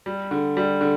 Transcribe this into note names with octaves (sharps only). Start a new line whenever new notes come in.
G3
D3
G3
D3